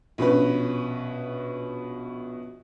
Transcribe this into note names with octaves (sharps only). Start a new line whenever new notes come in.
A#1 B2 C#4 B4